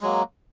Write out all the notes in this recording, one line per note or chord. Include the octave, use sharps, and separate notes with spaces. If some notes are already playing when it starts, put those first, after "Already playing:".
F#3 G#3 A#3